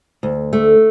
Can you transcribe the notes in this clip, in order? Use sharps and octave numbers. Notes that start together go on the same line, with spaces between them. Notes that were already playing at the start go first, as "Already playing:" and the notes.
D2
A3